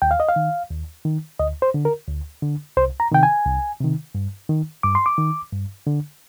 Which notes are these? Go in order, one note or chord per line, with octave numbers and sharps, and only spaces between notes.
D#2 G5
F5
D#5
F5
D#3
D#2
D#3
D2 D#5
C5
D3
A#4
D2
D3
C2 C5
A#5
C3 D#3 G5
G#5
C2
C3 D#3
G2
D#3
G2 D6
C6
D6
D#3
G2
D3